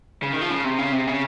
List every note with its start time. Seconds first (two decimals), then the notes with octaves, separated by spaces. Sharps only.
0.23 C#3
0.33 D#3
0.41 F3
0.50 C#3
0.65 C3
0.79 C#3
0.93 C3
1.07 C#3